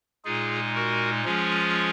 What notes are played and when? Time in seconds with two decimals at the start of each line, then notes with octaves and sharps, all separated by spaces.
0.25 A#2 G#3 D#4 F4 G#4
0.75 F#4 A#4
1.24 F3 G#3 C#4 F4 G#4